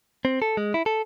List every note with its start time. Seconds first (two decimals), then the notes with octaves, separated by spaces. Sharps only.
0.25 C4
0.42 A4
0.57 G#3
0.74 E4
0.86 A4